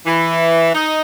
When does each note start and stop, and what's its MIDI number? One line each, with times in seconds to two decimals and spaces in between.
0.06 0.71 52
0.74 1.01 63